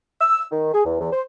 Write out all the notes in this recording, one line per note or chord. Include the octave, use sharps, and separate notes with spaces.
E6
D#3
G#4
E2
E2
C5